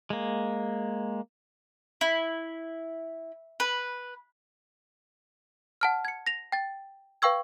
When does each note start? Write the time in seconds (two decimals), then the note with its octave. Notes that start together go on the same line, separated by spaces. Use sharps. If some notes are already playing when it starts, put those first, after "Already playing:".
0.10 G#3 A#3
2.01 E4
3.60 B4
5.81 F#5 A5 F6
6.05 G#6 C#7
6.27 A#6 F7
6.52 G5 A6
7.22 B4 F5 G5 C#6 E6 G#6